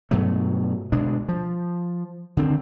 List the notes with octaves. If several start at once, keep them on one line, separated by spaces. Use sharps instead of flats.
G2 B2 F#3 A3
D2 B2 G#3 D4
F3
D3 D#3 C4